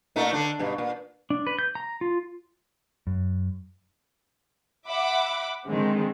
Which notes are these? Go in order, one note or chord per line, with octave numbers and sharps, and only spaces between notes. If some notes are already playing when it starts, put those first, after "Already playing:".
A#2 A3 D#4
D3 D4
G2 B2
A#2
D4
B4
G6
A#5
F4
F#2
E5 F#5 B5 D6
D3 D#3 G#3 C4